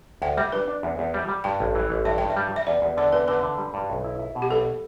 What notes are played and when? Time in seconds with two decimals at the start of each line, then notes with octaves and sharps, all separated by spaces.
0.22 D2 G5
0.37 G3 E5
0.52 D4 B4
0.68 D4
0.83 E2
0.99 E2
1.14 G3
1.29 G3
1.44 G2 G5
1.60 A1
1.75 E3
1.90 A1
2.05 G2 E5
2.18 G2 G5
2.30 E5
2.36 G3
2.51 G3 E5
2.67 E2 D5
2.82 E2
2.97 D3 D5
3.13 E2 B4
3.28 D3 B4
3.43 D3
3.58 G3
3.74 G2
3.90 B1
4.04 E4
4.19 E4
4.35 B2
4.42 G4
4.50 B1 A4